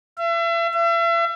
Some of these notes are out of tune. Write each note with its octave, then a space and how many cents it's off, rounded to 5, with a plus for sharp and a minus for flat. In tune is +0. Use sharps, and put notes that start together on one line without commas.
E5 +40
E5 +40